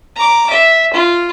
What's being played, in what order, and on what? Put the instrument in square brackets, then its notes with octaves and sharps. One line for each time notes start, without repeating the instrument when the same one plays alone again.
[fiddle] A#5 D6
E5
F4